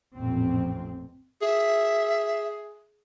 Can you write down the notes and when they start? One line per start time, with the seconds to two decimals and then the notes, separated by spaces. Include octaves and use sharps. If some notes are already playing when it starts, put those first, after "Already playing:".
0.15 A1 F2 A#2 C4
1.42 G#4 E5